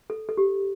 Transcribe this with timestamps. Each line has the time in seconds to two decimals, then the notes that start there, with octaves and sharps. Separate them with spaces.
0.10 A4
0.29 A4
0.37 G4